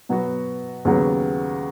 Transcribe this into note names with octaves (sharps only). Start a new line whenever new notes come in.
B2 F#3 B3 F#4
D#2 C#3 F#3 B3